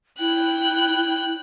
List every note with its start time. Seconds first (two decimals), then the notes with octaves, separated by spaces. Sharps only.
0.19 E4 G5 F#6